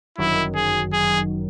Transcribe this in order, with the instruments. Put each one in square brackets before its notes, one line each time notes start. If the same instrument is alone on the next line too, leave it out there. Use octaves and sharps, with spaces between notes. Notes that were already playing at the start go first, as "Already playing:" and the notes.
[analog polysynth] G1 F#2 D#3 F#3 [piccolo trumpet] E4
[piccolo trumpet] G#4
G#4